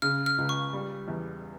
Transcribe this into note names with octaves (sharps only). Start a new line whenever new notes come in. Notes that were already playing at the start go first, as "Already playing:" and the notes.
C#3 F6
F6
C#2
C#6
G3
E2